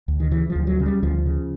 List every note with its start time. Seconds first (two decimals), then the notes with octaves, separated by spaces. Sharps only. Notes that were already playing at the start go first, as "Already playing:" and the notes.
0.08 D2
0.20 D#3
0.31 C#3 E3
0.50 F3
0.55 D2
0.67 F#3
0.80 C#3
0.86 G3
1.03 D2 F3
1.26 C#3